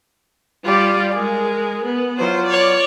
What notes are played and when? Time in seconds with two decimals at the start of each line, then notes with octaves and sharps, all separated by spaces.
0.65 G3 F4 G4 D5
1.14 G#3 G#4 A#4
1.85 B3
2.18 F#3 F4 C5
2.47 C#5 D5